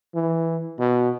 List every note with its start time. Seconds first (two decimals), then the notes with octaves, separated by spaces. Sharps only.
0.15 E3
0.79 B2